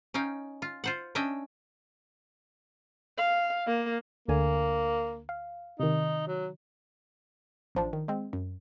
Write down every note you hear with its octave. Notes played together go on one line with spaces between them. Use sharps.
C#4 D#4 F5 G5
F4
F4 C5 F#5
C#4 D4 D#5 E5 G5
F5
A#3
D2 D3 A#3 G#5
F5
C3 D#3 D#4
F#3
A1 F3 D4
D#3
G#3 C4
F#2